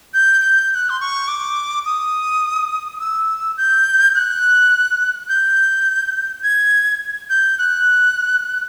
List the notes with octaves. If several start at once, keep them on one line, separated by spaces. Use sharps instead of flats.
G6
G6
G6
F#6
C6
C#6
D6
D#6
E6
G6
F#6
G6
G#6
G6
F#6